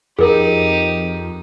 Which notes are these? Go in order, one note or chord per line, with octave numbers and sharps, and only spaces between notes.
F2 D#4 G4 G#4 A#4